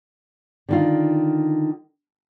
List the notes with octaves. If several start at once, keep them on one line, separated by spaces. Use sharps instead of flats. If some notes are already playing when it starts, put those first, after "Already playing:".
D3 D#3 F4